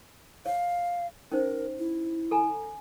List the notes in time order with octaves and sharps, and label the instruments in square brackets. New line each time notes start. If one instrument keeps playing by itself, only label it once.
[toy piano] C#5 [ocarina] F5
[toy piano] C#4 D#4 C5 [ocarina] A#4
[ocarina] E4
[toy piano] A4 G#5 A#5